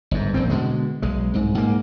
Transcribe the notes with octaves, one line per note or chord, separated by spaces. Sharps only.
G1 G#2
A#1 A2 C4
B2 D3 G#3
B1 G#3
C2 G#2
G#2 A#3